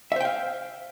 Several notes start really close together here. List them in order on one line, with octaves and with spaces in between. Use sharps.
E5 C5 G5 F5